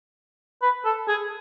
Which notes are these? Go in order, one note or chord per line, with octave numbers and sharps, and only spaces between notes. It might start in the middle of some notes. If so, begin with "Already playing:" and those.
B4
A4
G#4